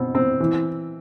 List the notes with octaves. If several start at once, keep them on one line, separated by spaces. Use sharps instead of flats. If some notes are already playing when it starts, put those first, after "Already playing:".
Already playing: B2 C4
C4
E3